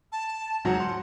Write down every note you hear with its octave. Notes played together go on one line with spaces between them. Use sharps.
A5
G#2 F#3 F#5
C6